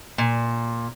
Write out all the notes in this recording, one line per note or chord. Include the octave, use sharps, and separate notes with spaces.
A#2